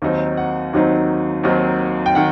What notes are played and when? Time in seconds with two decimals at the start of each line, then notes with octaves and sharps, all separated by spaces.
0.02 D#2 D#3 F#3 C4 D#4
0.37 F#5
0.73 D#2 D#3 F#3 C4 D#4
1.44 D#2 D#3 F#3 C4 D#4
2.06 G5
2.15 D#3 F#5